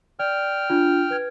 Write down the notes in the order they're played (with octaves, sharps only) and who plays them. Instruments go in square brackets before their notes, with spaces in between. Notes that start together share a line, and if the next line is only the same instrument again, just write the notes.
[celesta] D5 [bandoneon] G5 F6
[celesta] D4 F4
B4 G#6